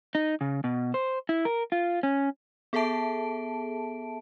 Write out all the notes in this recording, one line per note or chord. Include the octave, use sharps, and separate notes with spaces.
D#4
C#3
B2
C5
E4
A#4
F4
C#4
B3 G#4 A4 E5 A5 D7